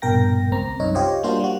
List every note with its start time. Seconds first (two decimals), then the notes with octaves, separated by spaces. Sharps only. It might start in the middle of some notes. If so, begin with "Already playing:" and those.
0.02 A#1 G2 B2 A#4 G5 A#6
0.52 C#2 C4 A#5
0.80 C2 F#2 D#4 C#5
0.95 F4 G4 C5 C#5 D#5
1.23 G3 A#3 D4 F4 F#4 C5
1.40 G3 F#4